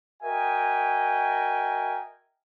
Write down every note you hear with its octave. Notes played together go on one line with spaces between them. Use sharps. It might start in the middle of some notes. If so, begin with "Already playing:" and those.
F#4 A#4 D#5 E5 G5 G#5